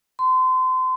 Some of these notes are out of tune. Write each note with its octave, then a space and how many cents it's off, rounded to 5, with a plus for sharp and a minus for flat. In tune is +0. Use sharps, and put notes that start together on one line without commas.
C6 -30